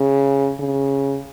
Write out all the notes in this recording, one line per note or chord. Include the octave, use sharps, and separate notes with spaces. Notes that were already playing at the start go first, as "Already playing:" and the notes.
Already playing: C#3
C#3